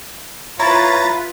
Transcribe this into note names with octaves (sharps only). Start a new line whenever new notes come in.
E4 F4 B4 C#5 A#5 A6